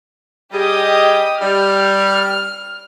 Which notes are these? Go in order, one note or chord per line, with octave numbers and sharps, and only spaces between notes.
G3 G4 G#4 D#5 D#6
G3 F6